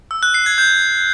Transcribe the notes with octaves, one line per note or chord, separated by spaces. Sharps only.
E6
F#6
C7
G#6
G6